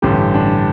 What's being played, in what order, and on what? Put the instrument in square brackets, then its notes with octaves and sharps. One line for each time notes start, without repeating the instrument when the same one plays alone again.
[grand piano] A1 G2 D3 G4
D4